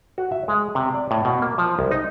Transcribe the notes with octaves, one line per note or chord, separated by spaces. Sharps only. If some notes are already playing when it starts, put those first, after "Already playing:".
F#4
E5
G#3
C3
D5
A2
B2
A#3
F3
C2
D#4